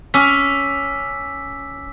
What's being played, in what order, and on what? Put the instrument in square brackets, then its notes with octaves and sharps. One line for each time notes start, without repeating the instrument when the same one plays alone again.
[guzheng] C#4 [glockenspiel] D6 E6 B6